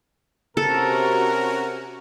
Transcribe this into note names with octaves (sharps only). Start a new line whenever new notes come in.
C3 C#4 F#4 A4 A#4